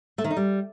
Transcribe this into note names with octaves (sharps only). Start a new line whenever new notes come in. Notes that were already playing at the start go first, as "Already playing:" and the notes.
A3
D#3
D#4
G3